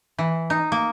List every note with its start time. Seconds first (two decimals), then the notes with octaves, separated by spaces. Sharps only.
0.18 E3
0.50 D#4
0.72 A#3